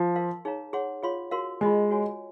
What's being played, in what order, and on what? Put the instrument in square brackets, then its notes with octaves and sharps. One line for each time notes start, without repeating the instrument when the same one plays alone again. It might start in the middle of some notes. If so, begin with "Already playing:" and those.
Already playing: [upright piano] F3
[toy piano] A#4 F5 C6
D#4 G#4 C#5 F5 A#5
G#4 C#5 F#5 C6
F4 G#4 C#5 F5 C6
F#4 A#4 F5 C6
[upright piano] G#3 [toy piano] F4 G#4 D#5 G#5
[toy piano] F#4 C#5 G#5